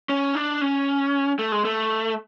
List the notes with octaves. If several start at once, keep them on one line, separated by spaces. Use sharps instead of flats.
C#4
D4
C#4
A3
G#3
A3